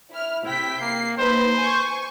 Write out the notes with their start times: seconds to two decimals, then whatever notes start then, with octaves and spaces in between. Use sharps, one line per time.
0.12 E4 F6
0.44 C3 E4 G5 B6
0.81 A#3 C7
1.18 A#3 D#4 B4 C5
1.57 G#5 C#6